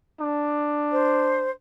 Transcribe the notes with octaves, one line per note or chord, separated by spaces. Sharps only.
D4
C5